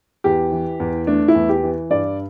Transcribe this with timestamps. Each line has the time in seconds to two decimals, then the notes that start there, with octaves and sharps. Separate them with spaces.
0.24 E2 G4
0.52 E3
0.80 E2
1.07 A3 D4
1.28 E4
1.35 E2
1.49 G4
1.63 E3
1.90 G2 D5